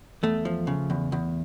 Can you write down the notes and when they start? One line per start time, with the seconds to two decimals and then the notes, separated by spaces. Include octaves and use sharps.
0.23 E2 A3
0.45 F3
0.67 C#3
0.90 E2
1.12 E2